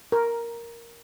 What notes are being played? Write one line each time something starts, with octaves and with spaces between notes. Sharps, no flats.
A#4